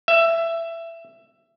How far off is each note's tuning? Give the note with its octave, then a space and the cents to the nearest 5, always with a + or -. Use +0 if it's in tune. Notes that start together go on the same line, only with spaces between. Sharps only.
E5 +15